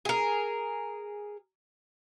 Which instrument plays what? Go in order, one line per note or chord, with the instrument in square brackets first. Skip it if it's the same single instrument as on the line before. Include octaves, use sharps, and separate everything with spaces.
[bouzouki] G#4 A#4